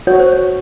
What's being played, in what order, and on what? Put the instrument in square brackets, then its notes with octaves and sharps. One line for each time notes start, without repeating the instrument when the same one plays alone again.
[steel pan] F#4 [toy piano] C#5
[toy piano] C5
C#5